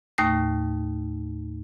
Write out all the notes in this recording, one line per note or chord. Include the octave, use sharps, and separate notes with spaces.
D#2 A2 A3 D#6 A#6